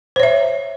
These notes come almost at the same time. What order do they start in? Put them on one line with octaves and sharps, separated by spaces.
C5 C#5 E5